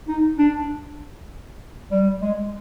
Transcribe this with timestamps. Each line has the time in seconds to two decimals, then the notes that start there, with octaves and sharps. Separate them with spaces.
0.08 D#4
0.38 D4
1.91 G3
2.22 G#3